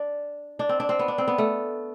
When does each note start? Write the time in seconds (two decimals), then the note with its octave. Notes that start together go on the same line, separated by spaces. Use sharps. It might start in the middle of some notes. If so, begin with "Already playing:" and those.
Already playing: D4
0.59 D4
0.69 C4
0.80 D4
0.89 C4
0.99 B3
1.08 D4
1.18 C4
1.28 B3
1.38 A3